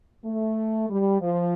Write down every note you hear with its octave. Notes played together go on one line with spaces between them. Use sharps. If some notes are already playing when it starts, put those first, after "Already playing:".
A3
G3
F3